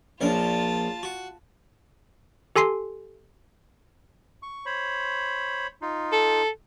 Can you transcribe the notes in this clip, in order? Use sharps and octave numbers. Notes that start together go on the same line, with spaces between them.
A#1 C#4 D4 F4 A#4 A5
F#4
G4 A4 G#5 C6 C7
C#6
C5 C#5 B5
D#4 F4
A4